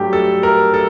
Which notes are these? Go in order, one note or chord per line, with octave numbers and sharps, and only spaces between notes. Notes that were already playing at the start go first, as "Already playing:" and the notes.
Already playing: G2 F#3 A3 G4
A4
A#4
A4